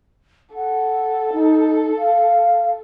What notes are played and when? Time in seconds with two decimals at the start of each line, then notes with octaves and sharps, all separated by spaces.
0.55 A4 F#5
1.33 D#4
1.98 F5